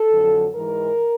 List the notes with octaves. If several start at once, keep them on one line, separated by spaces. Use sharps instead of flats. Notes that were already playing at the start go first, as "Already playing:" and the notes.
Already playing: A4
F2 D3 F#3
G#2 E3 G#3 A#4